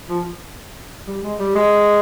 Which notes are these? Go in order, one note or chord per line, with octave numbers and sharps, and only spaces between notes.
F3
G3
G#3
G3
G#3